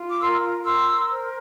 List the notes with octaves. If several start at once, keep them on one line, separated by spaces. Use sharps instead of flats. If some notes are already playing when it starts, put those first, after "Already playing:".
Already playing: F4
D6
A#4 C6 E6
A#4 C6 E6
C5